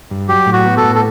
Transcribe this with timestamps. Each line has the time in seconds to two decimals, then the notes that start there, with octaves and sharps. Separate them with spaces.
0.11 G2
0.29 F#3 G4
0.46 A2
0.53 F#4
0.65 B3
0.77 A4
0.83 A2
0.96 A4